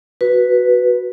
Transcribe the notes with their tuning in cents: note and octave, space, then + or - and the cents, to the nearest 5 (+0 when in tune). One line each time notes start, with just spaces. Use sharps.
F#4 +0 B4 +0